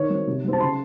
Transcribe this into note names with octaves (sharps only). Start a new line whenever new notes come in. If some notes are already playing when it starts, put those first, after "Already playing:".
Already playing: D#3 C#5
F#3 C4
C3
F#3 C4
A5
C#3 C6